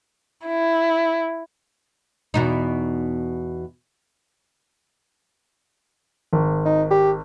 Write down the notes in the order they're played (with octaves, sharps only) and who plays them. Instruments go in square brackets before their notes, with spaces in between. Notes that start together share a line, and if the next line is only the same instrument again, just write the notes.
[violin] E4
[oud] E2 B2 D#4
[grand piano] G#1
[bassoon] D#4
G4